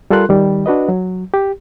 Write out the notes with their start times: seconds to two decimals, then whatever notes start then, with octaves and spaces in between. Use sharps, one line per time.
0.10 G3 F4 A4 A#4 C6 F#6
0.29 D#3 G3
0.66 D4 F#4 B4 D#5
0.89 F#3
1.34 G4